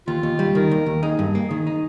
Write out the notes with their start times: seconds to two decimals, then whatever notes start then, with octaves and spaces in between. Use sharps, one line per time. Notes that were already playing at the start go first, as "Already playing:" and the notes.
0.07 D#2 F4
0.23 D#2
0.39 G3
0.55 D#3 A#4
0.71 D#2
0.86 D#2
1.03 D#4 G#4
1.19 G2
1.35 A#3
1.51 D#3 G#4
1.67 D#4